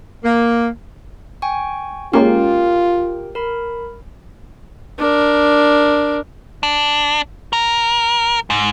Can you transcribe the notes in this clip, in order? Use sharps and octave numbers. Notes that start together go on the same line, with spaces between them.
A#3
G5 G#5 C#6
G#3 A#3 C#4 F4 G4 A#4 G5
A#4 B5
D4 A#4
D4
A#4
G#2